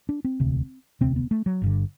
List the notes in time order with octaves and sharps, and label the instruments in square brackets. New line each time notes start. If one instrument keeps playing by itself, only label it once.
[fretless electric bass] D4
C4
E1 D2 C3
E1 D2 C3 C4
B3
A3
F#3
G1 G2 D3